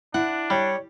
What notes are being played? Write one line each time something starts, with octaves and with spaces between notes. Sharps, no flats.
D4 E4 F#5
G3 C#5